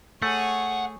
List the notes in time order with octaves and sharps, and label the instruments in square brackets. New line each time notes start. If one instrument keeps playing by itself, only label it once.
[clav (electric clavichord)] A3 [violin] G#4 C#5 [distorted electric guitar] F#5